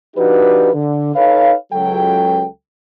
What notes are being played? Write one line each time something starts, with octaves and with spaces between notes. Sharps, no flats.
F3 D4 D#4 F#4 G4 B4
D3
D#4 A4 B4 C#5 F5
C#2 F#3 A4 G5